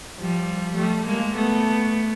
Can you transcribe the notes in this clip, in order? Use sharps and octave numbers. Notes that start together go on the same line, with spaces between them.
F3 G3
G3 A3
G#3 A#3
A3 B3